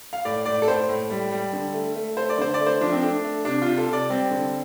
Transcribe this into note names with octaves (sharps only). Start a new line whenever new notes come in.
F5
A2 D5
A2 D5
A4
A2 C5
A2
G3
G3
D3
A3
A3
A3 C5
D5
D3 C5
D5
A3
C5
F3 D4
C4
A3 D4
A3
C3 D4
C3 F4
A4
C3 D5
G3 C4
D3